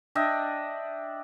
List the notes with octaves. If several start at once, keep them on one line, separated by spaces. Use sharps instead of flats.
D4 D#5 E5 G5